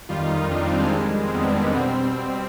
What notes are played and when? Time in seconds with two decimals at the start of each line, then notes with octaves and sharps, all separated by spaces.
0.09 F2 D#3 G3 F4
0.24 D#4
0.38 D#4
0.51 F2 D#3 G3 D4
0.65 C4
0.79 G#3
0.93 F2 D#3 G3
1.28 C4
1.35 F2 D#3 G3 B3
1.43 D4
1.48 C4
1.63 B3
1.76 B2 G3 C4